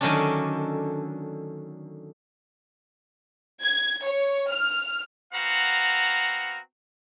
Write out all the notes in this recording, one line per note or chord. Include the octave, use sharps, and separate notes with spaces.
D3 D#3 F#3 A3 C#4 D4
G#6
C#5
F6
B3 C4 F#4 F5 F#5 A#5